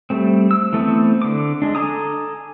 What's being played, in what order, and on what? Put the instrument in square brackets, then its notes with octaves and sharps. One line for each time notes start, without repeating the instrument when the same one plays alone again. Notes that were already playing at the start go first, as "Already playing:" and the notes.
[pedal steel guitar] G3 A3 C4
E6
E3 A3 B3 C4
D3 D6
G#3 D4
A4 G#5 A#5 D6 D#6